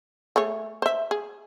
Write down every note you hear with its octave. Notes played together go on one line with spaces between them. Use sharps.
A3 G#4 C#5
C5 E5
G#4